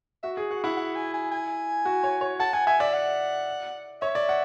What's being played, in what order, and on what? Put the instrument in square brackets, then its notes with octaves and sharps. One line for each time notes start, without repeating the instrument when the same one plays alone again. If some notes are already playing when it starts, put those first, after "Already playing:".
[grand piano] F#4 [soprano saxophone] E5
[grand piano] G#4
[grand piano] F#4 [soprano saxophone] F#5
[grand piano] E4 [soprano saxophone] F#5
[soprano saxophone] F#5
G#5
G#5
G#5
[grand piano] F#4
C#5
C#5
[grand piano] F#5 [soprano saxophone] A5
[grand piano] F#5 [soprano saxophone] G#5
[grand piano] E5 [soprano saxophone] G#5
[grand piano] D5 [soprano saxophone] E5
[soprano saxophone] F#5
[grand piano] C#5 [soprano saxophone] E5
[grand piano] D5
F#5